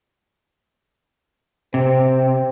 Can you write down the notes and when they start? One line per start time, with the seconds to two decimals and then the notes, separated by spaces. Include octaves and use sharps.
1.74 C3 C4